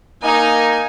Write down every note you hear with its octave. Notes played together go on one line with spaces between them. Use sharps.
A#3 D#4 G#5